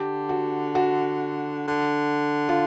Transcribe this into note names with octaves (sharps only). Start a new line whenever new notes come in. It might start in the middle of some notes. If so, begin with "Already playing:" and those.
Already playing: D3 G4
F#4
F#4
D3
F4